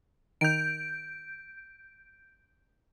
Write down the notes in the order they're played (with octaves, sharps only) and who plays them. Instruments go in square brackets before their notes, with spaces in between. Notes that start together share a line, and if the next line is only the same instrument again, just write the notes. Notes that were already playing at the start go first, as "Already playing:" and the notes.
[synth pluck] D#3 [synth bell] G6 D7